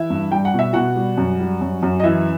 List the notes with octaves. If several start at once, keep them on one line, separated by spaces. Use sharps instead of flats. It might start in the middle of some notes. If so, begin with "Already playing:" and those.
Already playing: E3 E4 E5
G2
G3 G5
F#5
B2
E5
B2 F#4 F#5
G3
F#2
G3
F#2
F#2
D#5
E3 E4 E5